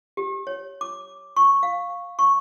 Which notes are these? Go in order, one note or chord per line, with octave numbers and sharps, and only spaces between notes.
G4
C#5
D6
C#6
F5
C#6